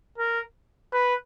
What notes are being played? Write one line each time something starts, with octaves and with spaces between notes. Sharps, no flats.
A#4
B4